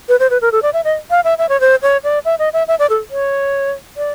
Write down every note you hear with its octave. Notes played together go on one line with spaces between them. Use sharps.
B4
C5
B4
A#4
A4
D5
E5
D#5
F5
E5
E5
C#5
C5
C#5
D5
E5
D#5
E5
E5
D5
A4
C#5
D5